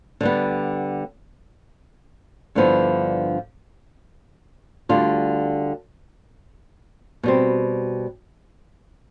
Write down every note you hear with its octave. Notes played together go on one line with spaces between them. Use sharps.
D3 G3 B3
G2 D3 F3 B3 E4
D2 D3 G3 D4 F4
B2 G3 C4